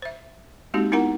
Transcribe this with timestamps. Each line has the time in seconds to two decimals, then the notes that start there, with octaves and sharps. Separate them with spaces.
0.02 C5 E5
0.74 G#3 A#3 C4 D#4 F#4 G4
0.92 B3 D#4 E4 A#4 F#5 A#5